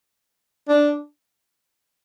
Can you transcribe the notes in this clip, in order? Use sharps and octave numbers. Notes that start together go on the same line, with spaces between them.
D4